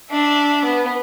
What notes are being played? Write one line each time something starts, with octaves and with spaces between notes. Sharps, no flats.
D4 E5
B3